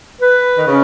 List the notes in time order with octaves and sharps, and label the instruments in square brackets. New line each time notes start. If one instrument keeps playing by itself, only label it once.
[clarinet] B4
[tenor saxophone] D#3
[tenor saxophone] C#3 [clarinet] C#4